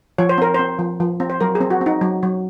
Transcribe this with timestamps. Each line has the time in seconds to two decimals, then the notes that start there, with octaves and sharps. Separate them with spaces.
0.18 F3 C#5
0.29 C5
0.38 C4 A#4
0.54 C4 C5
0.79 F3
1.00 F3
1.20 C4
1.30 C5
1.41 F#3 A#4
1.55 G#4
1.61 C4
1.70 F#4
1.81 C4 D#4
2.01 F#3
2.23 F#3